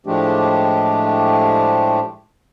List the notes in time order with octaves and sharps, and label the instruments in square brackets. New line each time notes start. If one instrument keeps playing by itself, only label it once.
[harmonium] A2 F3 G#3 A3 D4 G4